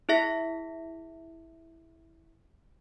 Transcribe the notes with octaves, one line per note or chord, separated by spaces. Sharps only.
E4 G#4 E5 A#6 B6